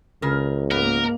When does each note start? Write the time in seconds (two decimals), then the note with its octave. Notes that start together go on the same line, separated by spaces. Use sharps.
0.22 C#2 C#3 A#4
0.71 G#2 A#3 B3 A#4